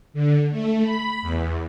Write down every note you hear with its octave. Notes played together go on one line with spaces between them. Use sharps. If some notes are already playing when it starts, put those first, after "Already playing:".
D3
A3
B5
E2